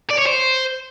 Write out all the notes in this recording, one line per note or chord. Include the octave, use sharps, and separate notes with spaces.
D5
C#5
C5